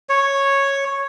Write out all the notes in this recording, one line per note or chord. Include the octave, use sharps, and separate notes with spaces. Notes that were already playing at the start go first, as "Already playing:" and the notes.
C#5